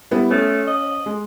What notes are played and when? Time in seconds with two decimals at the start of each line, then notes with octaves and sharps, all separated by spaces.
0.11 G3 B3 E4
0.30 A3 C#4
0.67 D#5
1.06 G#3